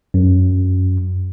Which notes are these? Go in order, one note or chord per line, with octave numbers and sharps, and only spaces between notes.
F#2